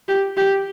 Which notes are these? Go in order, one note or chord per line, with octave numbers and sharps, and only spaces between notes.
G4
G4